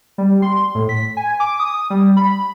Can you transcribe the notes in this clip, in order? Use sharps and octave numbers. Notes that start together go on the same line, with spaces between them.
G3
C6
A2
B6
G#5
D6
D#6
G3
B5